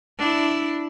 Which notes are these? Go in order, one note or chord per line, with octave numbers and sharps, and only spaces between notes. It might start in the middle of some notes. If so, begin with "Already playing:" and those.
D4 E4